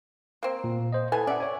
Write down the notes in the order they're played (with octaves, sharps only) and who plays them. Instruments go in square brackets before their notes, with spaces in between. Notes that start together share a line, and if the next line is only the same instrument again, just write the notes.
[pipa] A#3 C4
[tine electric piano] A#2
C5 D#5
[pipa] E3 B3 G#5 [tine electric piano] A4 G#6
[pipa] C3 D5 [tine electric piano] C#4 E5 F#5
[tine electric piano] C#5 G#5